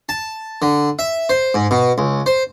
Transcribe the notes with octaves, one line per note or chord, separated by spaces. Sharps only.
A5
D3
E5
C5
G#2
B2
C#2
C5